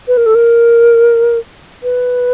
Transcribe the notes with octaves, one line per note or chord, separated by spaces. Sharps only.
B4
A#4
A4
A#4
B4